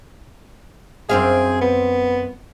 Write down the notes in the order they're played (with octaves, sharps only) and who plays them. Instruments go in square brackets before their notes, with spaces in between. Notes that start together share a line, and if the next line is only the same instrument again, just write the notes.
[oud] F#2 C4 F5 [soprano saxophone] G#4
[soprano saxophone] B3